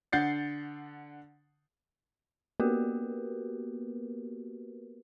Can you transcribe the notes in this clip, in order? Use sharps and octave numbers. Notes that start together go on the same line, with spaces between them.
D3 F#5 G6 A6 C7 C#7
A#3 B3 F#4 G4 A#4 B4